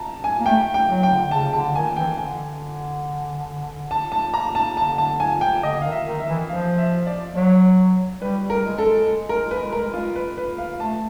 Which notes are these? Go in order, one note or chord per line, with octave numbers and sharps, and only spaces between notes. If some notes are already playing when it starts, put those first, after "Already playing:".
Already playing: A5 A#5
G#5
A#3
A3 G5
G5
F#3
G5
D3
C#3 A5
D3 A5
D#3 G#5
E3 G5
D3 G#5
A5
A5
A#5
A5
D3 A5
A5
G#5
G5
D3 D#5
D#3 F5
E5
D#3
E5
E3
F3 F5
E5
D5
F#3 C#5
G3 B4
G3
A#4
G#3
A4
G#3
A#4
B4
A#4
F4
B4
B4
F5
A3 A5